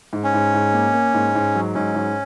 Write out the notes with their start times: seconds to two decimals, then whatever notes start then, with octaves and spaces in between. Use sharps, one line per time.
0.13 G#2
0.24 C#4
0.34 G#2
0.54 G#2
0.74 A#3
0.94 A#3
1.14 G#2
1.35 G#2
1.55 F#3
1.75 G#2 C#4
1.95 G#2